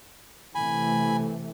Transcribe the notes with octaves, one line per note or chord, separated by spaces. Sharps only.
C3 E3 A3 G#5 B5